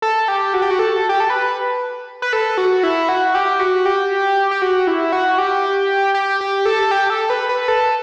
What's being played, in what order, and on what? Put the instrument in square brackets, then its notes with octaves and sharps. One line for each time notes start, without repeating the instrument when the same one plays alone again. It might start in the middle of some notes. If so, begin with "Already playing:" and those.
[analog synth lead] A4
G4
F#4
G4
F#4
A4
G4
A4
B4
B4
A4
F#4
E4
F#4
G4
F#4
G4
G4
F#4
E4
F#4
G4
G4
G4
A4
G4
A4
B4
B4
A4